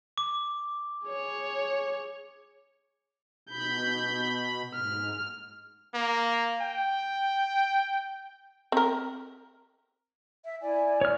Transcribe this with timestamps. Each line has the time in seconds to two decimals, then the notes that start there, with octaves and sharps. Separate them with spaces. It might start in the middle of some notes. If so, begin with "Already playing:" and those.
0.18 D6
1.07 G#4 C#5
3.50 B2 B5 G6
4.74 G#2 F6
5.94 A#3
6.61 G5
8.72 C4 A#4
10.44 E5
10.61 E4 D5 G#5
11.01 C#5 D5 F6